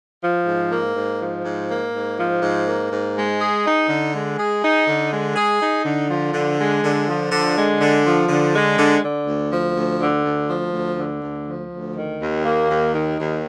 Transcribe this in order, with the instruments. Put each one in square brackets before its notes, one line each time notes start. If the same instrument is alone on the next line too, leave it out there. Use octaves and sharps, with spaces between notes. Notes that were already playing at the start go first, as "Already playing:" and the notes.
[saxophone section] F3
G#2
A#3
G#2
F3
G#2
A#3
G#2
F3
G#2
A#3
G#2
G#3
G#4
D#4
D3
G#3
G#4
D#4
D3
G#3
G#4
D#4
D3
F3
D3
G#3
D3
F3
D3
G#3
D3
F3
D3
G#3
D3
D3
D2
F3
D2
D3
D2
F3
D2
D3
D2
F3
D2
D#3
D#2
A#3
D#2
D#3
D#2